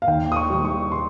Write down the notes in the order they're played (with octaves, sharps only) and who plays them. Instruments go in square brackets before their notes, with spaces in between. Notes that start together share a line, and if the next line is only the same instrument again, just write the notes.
[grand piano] F5
D#2 G5
D#6
C#6
D#3 G3
C#6
C6